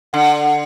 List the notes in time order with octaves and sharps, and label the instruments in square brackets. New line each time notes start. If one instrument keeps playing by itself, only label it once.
[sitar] D3 [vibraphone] F#5